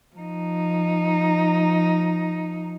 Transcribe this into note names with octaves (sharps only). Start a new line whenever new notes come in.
F3 D#4